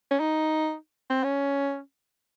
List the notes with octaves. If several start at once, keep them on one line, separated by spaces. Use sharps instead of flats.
C#4
D#4
C4
C#4